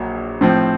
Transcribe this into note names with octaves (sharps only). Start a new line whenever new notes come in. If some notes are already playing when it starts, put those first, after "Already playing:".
Already playing: A#1 A#2 F#3
A2 F3 C4